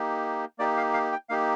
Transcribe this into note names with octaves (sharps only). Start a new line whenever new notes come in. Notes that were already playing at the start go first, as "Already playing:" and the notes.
Already playing: A#3 D#4 G4
A#3 D#4 G4 D5
F5
F5
G5
A#3 D#4 G4 F5